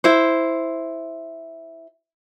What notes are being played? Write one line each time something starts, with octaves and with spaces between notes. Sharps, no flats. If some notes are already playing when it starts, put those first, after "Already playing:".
E4 C5